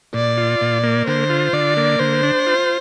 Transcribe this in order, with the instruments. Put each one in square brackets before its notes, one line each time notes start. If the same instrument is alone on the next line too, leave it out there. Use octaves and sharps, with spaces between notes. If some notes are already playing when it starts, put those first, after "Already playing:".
[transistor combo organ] A#2 [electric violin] D5
[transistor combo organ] F4
A#2
A#3
[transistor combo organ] D3 [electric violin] C5
[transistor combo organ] F4
[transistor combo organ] D3 [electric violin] D5
[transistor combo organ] A#3
[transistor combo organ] D3 [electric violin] C5
[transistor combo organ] D4
F4